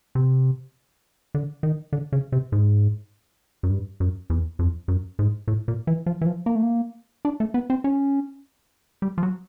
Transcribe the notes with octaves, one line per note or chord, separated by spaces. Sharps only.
C3
D3
D#3
D3
C#3
C3
G#2
F#2
G2
F#2
E2
F2
F#2
G#2
A2
A#2
E3
F3
E3
F3
A#3
A3
A#3
D4
A3
B3
C4
C#4
G3
F3
F#3